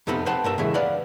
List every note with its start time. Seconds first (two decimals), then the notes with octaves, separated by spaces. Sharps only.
0.07 F2 C3 B3 D#4 A4 B5
0.26 B4 C5 F#5 G5 A5 B5
0.44 G2 A#4 E5
0.58 C#2 A2 E3 G#4 E5
0.74 B4 D5 F5 F#5 B5